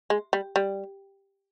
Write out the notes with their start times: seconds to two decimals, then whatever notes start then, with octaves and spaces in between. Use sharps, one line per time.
0.10 G#3
0.33 G3
0.56 G3